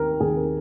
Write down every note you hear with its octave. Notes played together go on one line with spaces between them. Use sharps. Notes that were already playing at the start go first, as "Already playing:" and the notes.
Already playing: D#2 D#3 A#4
D#2 D#3 G#4
A#4